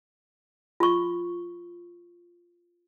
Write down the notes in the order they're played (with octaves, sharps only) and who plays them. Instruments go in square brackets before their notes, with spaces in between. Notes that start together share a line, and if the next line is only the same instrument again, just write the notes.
[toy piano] F4 C#6